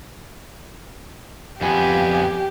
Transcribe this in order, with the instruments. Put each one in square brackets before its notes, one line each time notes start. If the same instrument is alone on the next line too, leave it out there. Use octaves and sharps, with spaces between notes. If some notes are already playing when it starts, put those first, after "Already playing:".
[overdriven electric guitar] F2 B3 [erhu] G4 [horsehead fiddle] G#5